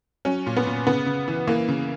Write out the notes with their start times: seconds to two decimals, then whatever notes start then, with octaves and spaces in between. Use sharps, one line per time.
0.25 F#3 C#4
0.46 A#2
0.57 B3
0.67 A#2
0.87 C#3 B3
1.06 C#3
1.28 E3
1.47 E3 A#3
1.68 C#3